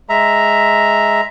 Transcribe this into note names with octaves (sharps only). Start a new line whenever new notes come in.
G#3 E5 A#5